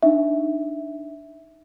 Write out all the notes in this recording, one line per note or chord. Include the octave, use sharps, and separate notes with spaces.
D4 D#4 E5